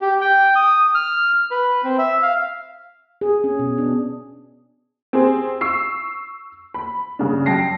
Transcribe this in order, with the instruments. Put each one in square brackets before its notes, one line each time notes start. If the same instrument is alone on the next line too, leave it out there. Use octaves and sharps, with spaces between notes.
[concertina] G4
G5
D#6
F6
B4
C4
E5
F5
[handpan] G#4
C#4
B2
D4
[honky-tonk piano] C4 G4 G#4 C5
C#6 E6 C7
B5
G2 C#3 D4
F#2 G5 A5 A#6 C7